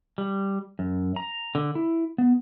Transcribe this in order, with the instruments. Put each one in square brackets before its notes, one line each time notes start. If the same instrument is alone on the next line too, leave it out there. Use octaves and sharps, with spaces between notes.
[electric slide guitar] G3
F#2
A#5
D3
E4
B3